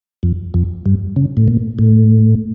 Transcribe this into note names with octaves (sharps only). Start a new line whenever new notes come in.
F2
F2
G2
C#3
A2
A#2
A2